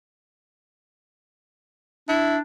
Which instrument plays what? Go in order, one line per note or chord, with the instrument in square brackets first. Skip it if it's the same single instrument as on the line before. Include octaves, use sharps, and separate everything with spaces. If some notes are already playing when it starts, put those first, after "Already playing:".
[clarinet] D4 [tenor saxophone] E4